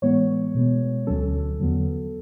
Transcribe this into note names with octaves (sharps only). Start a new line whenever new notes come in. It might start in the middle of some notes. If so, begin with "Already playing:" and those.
A2 E3 G#3 B3 C#5
B2 G#3 B3
D2 D3 F#3 C#4 A4
E2 D3 F#3 B3